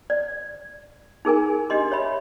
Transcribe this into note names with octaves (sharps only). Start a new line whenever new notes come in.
D5
D#4 G#4 A#4 G#5
D4 G4 D#5 C6
C#5 E5 B5